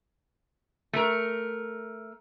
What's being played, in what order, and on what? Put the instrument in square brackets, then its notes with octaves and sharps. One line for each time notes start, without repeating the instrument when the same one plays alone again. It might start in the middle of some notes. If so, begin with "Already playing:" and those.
[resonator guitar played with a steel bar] A3 A#4